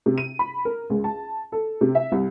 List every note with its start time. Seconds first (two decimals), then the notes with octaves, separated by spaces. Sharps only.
0.06 C3
0.18 D#7
0.39 B5
0.65 A#4
0.90 C#2
1.04 A5
1.52 A4
1.81 C3
1.95 E5
2.12 C2